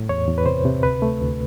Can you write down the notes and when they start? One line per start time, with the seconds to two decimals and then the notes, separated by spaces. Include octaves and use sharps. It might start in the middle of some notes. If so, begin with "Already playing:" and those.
Already playing: A2
0.09 E2 C#5
0.27 E2
0.38 B4
0.46 C3 C5
0.65 C3
0.83 D2 B4
1.02 A3
1.21 D2